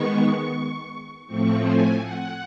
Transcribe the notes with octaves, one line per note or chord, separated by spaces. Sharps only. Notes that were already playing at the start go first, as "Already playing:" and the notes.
Already playing: D#3 G#3 B3 C#6
A2 F3 A3 C4 C#6
G#5
F#5